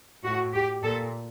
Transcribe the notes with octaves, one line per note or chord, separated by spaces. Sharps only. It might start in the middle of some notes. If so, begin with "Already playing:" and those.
A2 F#4
G4
A#2 A4